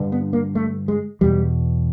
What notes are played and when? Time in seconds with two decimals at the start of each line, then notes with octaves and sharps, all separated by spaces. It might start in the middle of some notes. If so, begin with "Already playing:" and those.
Already playing: G2 D3
0.12 B3
0.33 A#3
0.55 A3
0.88 G#3
1.21 E2 B2 G3